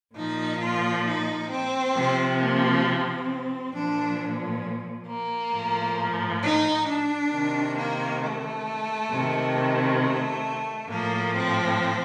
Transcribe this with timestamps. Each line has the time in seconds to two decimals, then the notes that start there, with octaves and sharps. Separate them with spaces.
0.15 A#2 F3 D#4
0.60 F4
1.05 D#4
1.51 C4
1.94 C3 F3
2.39 A#3
2.85 C4
3.73 A#2 F3 D4
5.08 A#3
5.53 A2 F3
6.43 D#4
6.87 D4
7.32 C3 D#3
7.77 A#3
8.22 A3
9.11 C3 D#3
10.00 A3
10.90 A2 F3 A#3
11.36 C4